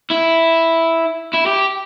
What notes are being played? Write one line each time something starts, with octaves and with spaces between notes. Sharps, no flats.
E4
E4
G4